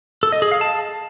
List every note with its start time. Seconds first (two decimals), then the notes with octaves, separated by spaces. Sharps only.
0.23 A4
0.32 D#5
0.42 G#4
0.52 F5
0.61 A5